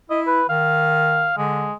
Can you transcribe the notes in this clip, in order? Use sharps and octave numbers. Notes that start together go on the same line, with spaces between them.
E4 D#5
B4
D#3 F5
D3 G#3